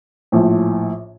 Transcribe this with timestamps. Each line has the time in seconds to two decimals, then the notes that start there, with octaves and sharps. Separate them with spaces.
0.32 A#1 A2 F3